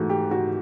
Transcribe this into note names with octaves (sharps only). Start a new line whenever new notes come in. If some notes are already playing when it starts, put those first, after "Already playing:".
Already playing: G#2 E3 A3 F#4
G4
F#4